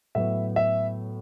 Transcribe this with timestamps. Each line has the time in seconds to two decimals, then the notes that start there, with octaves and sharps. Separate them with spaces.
0.15 A2 F#3 B3 E5
0.56 E5